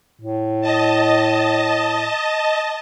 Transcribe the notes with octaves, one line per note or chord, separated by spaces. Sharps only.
A2
D#5 A5